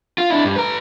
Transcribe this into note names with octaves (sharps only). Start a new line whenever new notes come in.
F4
D4 E4
G2
B4 A#5